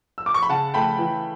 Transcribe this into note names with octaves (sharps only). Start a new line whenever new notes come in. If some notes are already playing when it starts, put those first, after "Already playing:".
E6
D6
C#6
B5
C#3 F#5 A5
A3 G5 B5
E3